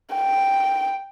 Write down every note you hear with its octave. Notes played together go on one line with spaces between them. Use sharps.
G5